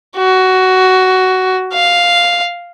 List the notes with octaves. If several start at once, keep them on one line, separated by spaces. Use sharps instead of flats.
F#4
F5